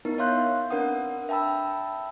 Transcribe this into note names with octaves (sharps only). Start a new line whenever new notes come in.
B3 D#4 E4 A#4
C#5 E5 F5 C6 F#6 G6
C4 D4 A#4 B4 F#5 D#6
E5 G5 A5 B5 E6